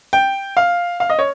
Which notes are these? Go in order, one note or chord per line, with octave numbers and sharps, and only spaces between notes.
G5
F5
F5
D#5
C#5